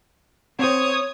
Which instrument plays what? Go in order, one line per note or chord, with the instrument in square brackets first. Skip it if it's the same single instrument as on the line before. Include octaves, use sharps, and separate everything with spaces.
[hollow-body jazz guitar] C4 C5 [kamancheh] C#5 D#6